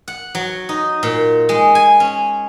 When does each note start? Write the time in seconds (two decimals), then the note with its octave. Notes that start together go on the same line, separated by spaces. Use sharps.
0.08 F#5
0.35 F#3
0.69 D#4
1.03 A#2
1.49 G#3
1.75 G#5
2.00 C#4